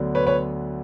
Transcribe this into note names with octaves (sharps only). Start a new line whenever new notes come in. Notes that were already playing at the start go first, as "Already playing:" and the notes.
Already playing: D2 D3 F#3 B3 D4
B4 C#5
B4 C#5